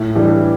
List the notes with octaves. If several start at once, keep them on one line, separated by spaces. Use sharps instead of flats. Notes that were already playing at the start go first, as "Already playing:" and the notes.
Already playing: A2
E3 G3 D4